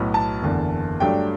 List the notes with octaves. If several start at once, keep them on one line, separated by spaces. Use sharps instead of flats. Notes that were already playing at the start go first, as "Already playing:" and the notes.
Already playing: B1 A2 F#3 B3
A5
F#1 E2 D3
G2 F#3 A3 D4 G5